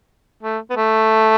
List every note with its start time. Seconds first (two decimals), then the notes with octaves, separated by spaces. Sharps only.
0.43 A3
0.70 B3
0.76 A3